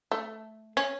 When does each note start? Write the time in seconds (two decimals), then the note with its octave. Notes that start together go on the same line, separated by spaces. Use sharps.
0.12 A3
0.77 C#4